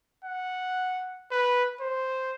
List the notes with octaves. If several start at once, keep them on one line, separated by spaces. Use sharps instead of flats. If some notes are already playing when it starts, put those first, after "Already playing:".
F#5
B4
C5